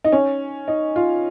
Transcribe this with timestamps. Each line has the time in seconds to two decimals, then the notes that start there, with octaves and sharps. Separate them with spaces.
0.04 D#4
0.12 C#4
0.68 D#4
0.96 F4